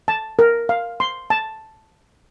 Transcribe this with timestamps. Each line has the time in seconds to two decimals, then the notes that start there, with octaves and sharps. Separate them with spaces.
0.08 A5
0.39 A#4
0.69 F5
1.00 C6
1.30 A5